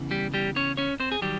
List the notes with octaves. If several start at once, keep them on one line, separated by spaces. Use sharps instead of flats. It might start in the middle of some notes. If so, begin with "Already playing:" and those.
Already playing: E2 C#3 E3
G3 G4
G3 G4
C#4 C#5
C#4 C#5
C4 C5
G#4
D#3 F#3 G3 G4